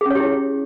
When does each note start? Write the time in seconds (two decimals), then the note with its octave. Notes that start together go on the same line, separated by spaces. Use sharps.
0.01 G#4
0.06 C#4
0.11 C#5
0.15 G4
0.20 E4